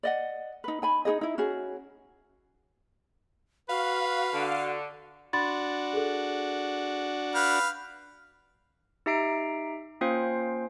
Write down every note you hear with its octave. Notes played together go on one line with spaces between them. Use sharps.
D5 D#5 F#5
D#4 B4
D#4 G#5 B5
D#4 F#4 G#4 D#5
D#4 E4
C#4 F#4 G#4
F#4 B4 F5
D3
D4 F#4 B5 C6 A6
G#4 A4
B4 F5 G6
D#4 G4 E5 A#5 C7 D7
A#3 C#4 F4 C5 F5 G5